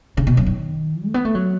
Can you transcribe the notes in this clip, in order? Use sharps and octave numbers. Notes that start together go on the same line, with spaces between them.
C#3
B2
F#2
D#3
A3
B3
A3
F#3